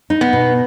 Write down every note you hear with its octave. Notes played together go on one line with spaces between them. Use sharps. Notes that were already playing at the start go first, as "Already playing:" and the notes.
D#4
B3
B2